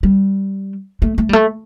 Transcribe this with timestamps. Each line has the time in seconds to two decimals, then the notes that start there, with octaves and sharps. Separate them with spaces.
0.03 G3
1.02 A3
1.18 A3
1.29 G3
1.33 A3